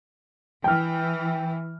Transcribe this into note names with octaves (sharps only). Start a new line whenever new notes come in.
E3 G5 F6